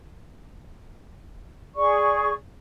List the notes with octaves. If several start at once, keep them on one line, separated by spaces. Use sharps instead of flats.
G#4 D5 C#6